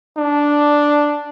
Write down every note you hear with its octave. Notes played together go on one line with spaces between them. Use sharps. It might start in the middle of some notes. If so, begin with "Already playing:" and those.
D4